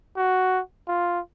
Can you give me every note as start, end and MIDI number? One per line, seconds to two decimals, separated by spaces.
0.16 0.60 66
0.88 1.20 65